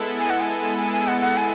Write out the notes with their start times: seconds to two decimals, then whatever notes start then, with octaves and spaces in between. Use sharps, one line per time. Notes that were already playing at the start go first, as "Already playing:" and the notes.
Already playing: G#3 B3 E4 A4
0.19 G#5
0.30 F#5
0.41 G#5
0.78 G#5
0.93 G#5
1.08 F#5
1.21 F#5
1.37 G#5